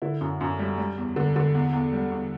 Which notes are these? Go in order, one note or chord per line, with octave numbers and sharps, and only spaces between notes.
D3 E4
F#2
F#2
G3
G3
E2
D3
D3
E2
E2
G3
E2